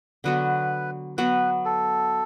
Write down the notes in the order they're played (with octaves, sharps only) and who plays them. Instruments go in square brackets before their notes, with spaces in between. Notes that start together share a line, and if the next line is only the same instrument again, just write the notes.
[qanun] D3 F#3 B3 F#4 [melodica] B4
[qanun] F#3 B3 F#4 [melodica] B4
[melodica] A4